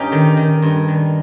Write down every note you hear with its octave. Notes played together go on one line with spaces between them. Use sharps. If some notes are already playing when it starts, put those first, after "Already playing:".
Already playing: G2 C#4 D#4 G4
D#3
D#3
G2
D#3